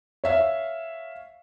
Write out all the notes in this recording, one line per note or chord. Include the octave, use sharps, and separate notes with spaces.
C#5 E5 F5